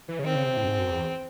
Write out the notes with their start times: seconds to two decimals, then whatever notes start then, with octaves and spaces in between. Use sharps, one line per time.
0.08 E3
0.19 C#3
0.24 D#3 C4
0.35 C#3
0.46 C3
0.57 A2
0.64 F#2
0.67 G#2
0.79 F#2
0.90 E2